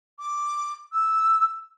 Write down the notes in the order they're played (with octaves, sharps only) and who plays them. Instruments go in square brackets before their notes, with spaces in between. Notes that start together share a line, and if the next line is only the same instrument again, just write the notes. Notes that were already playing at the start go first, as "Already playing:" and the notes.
[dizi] D6
E6